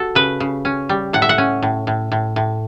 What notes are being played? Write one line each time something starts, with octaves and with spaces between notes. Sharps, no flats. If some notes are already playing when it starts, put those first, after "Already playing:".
Already playing: F#4 A4
C#3 B4
C#3
C#4
G3
A2 F#5
E5
F#5
C#4
A2
A2
A2
A2